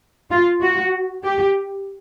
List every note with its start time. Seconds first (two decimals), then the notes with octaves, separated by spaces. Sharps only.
0.31 F4
0.62 F#4
1.24 G4